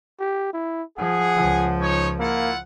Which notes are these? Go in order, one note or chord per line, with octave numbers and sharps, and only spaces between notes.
G4
E4
F3 G#4 F#5
C#2 F3
D#4 C#5
A#3 E4 F4 F#5